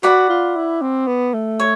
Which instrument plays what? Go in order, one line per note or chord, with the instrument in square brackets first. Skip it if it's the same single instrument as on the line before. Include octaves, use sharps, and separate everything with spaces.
[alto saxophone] F#4 [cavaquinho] B4 D5 F#5 B5
[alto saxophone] F4
E4
C4
B3
A3
[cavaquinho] C#5